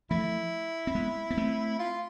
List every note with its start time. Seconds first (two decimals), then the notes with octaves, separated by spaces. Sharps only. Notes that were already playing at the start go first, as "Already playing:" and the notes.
0.11 F3 A3 E4
0.87 C4
0.95 G#3 B3
1.31 B3
1.37 A3 C4
1.79 F4